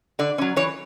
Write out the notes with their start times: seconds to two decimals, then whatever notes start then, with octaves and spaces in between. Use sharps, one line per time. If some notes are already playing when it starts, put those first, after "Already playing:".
0.19 D3 D5
0.38 F#3 C#4
0.56 E3 C#5